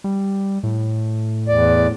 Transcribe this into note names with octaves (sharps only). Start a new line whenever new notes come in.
G3
A2
E2 D5